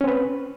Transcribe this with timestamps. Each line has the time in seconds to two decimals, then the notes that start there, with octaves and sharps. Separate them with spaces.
0.01 C#4
0.04 C4
0.07 B4